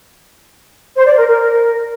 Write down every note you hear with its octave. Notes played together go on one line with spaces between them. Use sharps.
C5
D5
A#4
A#4